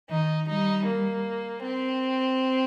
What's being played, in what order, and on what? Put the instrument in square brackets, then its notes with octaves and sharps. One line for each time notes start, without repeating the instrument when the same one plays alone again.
[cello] D#3 [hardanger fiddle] D#4
[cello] G3 [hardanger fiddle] D#4
[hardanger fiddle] A#3
C4